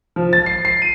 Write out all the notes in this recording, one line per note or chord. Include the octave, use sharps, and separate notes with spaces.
F3
A6
C7
C7
D#7